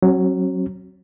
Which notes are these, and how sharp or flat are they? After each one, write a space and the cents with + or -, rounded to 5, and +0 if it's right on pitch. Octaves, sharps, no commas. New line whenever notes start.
F#3 +10 C#4 -45